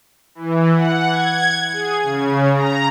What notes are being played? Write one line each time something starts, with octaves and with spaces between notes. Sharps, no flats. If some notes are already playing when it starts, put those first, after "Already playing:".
E3
F#5
G#6
G#4
C#3
A#5